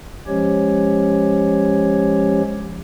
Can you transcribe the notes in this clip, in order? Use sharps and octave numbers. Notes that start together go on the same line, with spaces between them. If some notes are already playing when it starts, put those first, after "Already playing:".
F3 G#3 C#4 G4 C#5